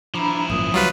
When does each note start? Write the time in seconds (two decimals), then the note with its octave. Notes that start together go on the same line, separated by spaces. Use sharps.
0.14 F3 D4 E4 A#5 B5
0.50 G#1 F#2 A#2 D#6
0.74 C#2 F#3 G3 F4 B4